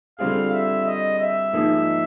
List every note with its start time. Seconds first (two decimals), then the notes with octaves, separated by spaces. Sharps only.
0.19 D3 G3 C4 F4 G#4 F5
0.52 E5
0.86 D#5
1.20 E5
1.53 G#2 F3 A#3 D#4 G#4